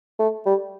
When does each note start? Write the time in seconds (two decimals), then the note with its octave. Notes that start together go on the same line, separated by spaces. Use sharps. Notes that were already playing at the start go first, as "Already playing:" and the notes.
0.19 A3
0.46 G3